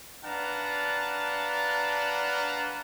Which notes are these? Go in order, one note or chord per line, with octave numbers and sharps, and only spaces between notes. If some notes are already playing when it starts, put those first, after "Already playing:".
D4 B4 F5 F#5 A5 A#5